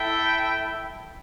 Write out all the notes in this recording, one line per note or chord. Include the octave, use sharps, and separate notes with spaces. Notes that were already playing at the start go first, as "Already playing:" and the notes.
Already playing: E4 A4 E5 G5